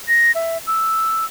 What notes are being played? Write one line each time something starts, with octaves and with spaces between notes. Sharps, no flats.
A#6
E5
E6